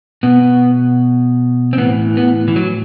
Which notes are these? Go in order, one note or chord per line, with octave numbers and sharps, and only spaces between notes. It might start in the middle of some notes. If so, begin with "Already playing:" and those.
B2 B3
C4
A2 E3 B3
B3
E3
F#3